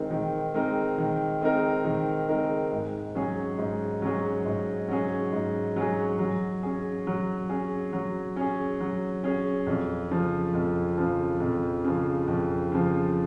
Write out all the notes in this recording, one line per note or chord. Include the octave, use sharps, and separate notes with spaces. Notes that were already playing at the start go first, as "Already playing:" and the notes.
Already playing: D#3 G#3 C4 D#4 A#4
D#3
G#3 C4 D#4 A#4
D#3
G#3 C4 D#4 A#4
D#3
G#3 C4 D#4 A#4
G#2
F#3 C#4 G#4
G#2
F#3 C#4 G#4
G#2
F#3 C#4 G#4
G#2
F#3 C#4 G#4
F#3
C#4 G#4
F#3
C#4 G#4
F#3
C#4 G#4
F#3
C#4 G#4
F2
C#3 F3
F2
C#3 F3
F2
C#3 F3
F2
C#3 F3